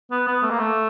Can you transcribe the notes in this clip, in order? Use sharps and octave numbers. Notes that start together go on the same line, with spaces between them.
B3
B3
A3
A#3
A3